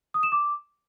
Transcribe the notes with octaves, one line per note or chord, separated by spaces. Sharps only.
D#6
E7
D6